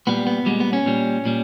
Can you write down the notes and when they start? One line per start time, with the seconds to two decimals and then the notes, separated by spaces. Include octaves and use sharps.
0.07 A#2 G3 B3
0.27 B3
0.46 A#2 G3 G#3
0.60 B3
0.73 C#4
0.86 A#2 G3
1.25 A#2 G3